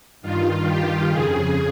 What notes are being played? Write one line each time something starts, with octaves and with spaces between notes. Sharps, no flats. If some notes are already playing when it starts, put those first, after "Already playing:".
G2 D#3 F4
G4
F2 C#3 G#4